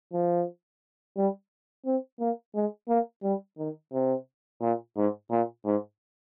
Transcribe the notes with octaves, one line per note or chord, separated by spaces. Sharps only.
F3
G3
C4
A#3
G#3
A#3
G3
D#3
C3
A#2
G#2
A#2
G#2